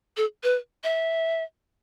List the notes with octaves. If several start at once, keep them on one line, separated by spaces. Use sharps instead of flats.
A4
B4
E5